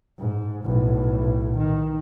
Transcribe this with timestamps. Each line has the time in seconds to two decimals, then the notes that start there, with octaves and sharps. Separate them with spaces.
0.19 G#2
0.64 B1 A2
1.59 D#3